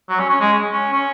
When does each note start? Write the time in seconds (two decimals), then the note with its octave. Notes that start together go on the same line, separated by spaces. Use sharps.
0.09 F#3
0.19 C#4
0.30 C#4
0.40 G#3
0.72 C#4
0.93 C#4